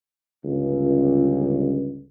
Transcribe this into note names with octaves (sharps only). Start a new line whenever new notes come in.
G1 C#2